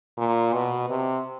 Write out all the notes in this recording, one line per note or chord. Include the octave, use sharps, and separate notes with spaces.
A#2
B2
C3